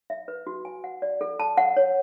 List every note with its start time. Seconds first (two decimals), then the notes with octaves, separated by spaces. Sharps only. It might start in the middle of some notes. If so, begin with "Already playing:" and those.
0.10 E5
0.28 B4
0.47 F#4
0.65 G#5
0.84 F#5
1.02 D5
1.21 A4
1.40 A5
1.57 F#5
1.76 C#5